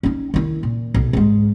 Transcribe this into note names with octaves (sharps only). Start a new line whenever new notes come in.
C#4 D#4
D#3 E4
A#2
B1
G#2 G#3